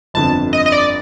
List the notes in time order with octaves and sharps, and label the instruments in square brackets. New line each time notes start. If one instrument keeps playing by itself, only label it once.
[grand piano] G1 F2 D3 [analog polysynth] A5
[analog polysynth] D#5
D#5
D5